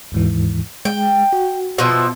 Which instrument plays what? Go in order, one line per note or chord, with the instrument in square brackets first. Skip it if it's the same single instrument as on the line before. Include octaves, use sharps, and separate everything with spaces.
[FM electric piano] D#2 G#2 E3
[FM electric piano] G#3 [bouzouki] G5
[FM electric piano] F#4
[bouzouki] B2 F3 E5